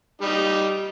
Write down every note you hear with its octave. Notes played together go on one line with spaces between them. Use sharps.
G3 D#4